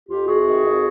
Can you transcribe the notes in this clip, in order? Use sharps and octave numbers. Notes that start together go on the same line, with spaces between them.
F2 F4 G4
C3 F#4 G#4
D#3
F2